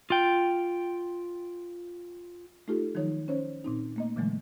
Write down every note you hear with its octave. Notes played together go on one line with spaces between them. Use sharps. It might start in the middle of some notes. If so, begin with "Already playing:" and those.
F4 G5
A3 D#4 F4 G4 A4
D#3 F3 F#3 D#4 C#5
C#4 C5 C#5
A#2 C4 D#4
A3 A#3 D#5
A#2 D3 E3 F#3 G#3 A3